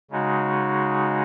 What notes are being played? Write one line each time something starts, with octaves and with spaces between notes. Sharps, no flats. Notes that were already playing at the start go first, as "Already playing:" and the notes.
C#3 G#3 D#4 F#4